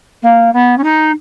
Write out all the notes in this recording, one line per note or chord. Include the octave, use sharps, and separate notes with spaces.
A#3
B3
C#4
D#4